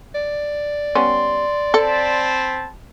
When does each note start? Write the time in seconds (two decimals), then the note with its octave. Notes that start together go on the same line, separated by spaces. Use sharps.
0.15 D5
0.95 G3 B3 C#4 C6
1.74 C4 A4 A5 B5